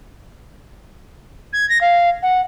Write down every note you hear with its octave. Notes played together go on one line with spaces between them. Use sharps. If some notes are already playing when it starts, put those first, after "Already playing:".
G#6
A#6
F5
F#5